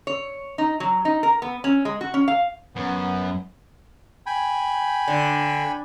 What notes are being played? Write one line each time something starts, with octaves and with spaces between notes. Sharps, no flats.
C#5
D#4
F#3
D#4
A#4
B3
C#4
G#3
F#4
C#4
F5
F#2 B3
G5 G#5 B5
D3